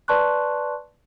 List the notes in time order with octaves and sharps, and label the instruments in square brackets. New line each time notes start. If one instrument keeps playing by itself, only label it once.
[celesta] B4 D5 A5 C6 C#6 F#6